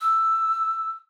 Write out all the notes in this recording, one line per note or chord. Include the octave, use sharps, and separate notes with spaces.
E6